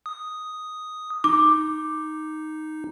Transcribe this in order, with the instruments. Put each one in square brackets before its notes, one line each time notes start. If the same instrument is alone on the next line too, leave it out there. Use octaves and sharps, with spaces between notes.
[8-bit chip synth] D#6
[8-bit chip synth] D#4 [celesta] D6